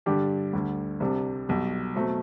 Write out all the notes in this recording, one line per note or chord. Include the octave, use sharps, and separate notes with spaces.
G2 D3 G3 D4 G4
D2 D3 G3
C2 C3 G3 D4
B1 B2 G3
B2 F#3 A3 C4